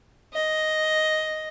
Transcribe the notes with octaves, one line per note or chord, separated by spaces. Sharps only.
D#5